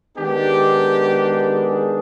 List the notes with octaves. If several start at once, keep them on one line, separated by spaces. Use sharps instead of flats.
D#3 G#3 B3 D4 G4
G#4